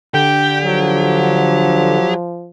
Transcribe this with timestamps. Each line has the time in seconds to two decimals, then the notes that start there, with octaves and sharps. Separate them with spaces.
0.14 D3 G4 G5
0.64 F3 F#3